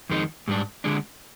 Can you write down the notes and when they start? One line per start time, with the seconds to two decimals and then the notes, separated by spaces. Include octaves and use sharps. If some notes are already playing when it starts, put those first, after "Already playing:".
0.09 F2 D#3 G#3 D#4
0.48 G#2 G3 D4
0.84 D3 G#3 D4